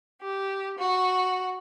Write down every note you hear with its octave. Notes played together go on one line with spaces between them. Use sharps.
G4
F#4